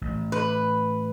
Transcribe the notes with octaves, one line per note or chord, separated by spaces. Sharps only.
A1
B4